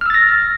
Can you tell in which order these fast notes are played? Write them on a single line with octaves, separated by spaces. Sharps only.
F6 E6 A6 A#6